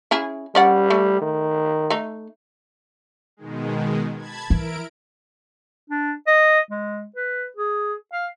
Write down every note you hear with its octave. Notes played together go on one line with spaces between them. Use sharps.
C#4 E4 G#4
G3 C#4 D5 F#5
A3
D#3
A3 D#4
B2 D#3 G#3
A5 B5 G#6
E3 E4 A#4 D7
D4
D#5
G#3
B4
G#4
F5